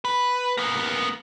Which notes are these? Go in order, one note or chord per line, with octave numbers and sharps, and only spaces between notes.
B4
A#3 B3